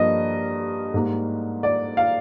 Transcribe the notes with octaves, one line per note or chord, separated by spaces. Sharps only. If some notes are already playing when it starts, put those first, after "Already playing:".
Already playing: G2 F3 A#3 D#5
G#2 G3 A#3
D5
F5